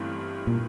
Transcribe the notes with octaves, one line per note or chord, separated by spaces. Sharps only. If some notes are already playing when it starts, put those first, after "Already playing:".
Already playing: G1 G2 E3 A3 C4
A#2